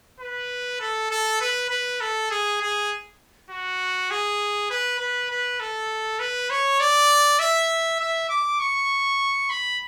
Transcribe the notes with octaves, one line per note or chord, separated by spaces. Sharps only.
B4
A4
A4
B4
B4
A4
G#4
G#4
F#4
G#4
B4
B4
B4
A4
B4
C#5
D5
E5
E5
D6
C#6
B5